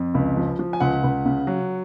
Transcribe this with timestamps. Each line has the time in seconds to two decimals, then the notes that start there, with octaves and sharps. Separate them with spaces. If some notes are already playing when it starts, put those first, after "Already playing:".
Already playing: F2
0.15 C#2
0.37 F3
0.59 F3
0.73 G#5
0.80 C#2 F#5
1.04 C#2
1.26 C#3
1.47 F#3